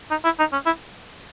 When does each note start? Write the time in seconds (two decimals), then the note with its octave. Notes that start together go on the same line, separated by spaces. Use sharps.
0.11 D#4
0.25 E4
0.40 D#4
0.53 C#4
0.66 E4